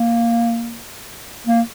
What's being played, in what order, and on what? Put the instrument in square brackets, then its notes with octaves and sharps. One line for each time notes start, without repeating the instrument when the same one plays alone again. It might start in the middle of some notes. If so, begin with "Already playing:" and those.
Already playing: [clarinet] A#3
A#3